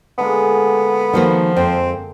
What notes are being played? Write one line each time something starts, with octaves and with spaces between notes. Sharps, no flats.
D3 G#3 A#3 B3
D#3 F3 A#3 F#4 F#5
F2 C4